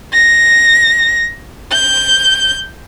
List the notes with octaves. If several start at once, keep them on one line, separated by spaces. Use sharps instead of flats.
A#6
G6